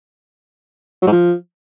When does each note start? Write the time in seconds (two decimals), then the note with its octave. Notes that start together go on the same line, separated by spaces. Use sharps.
1.02 F#3
1.07 G#2
1.12 F3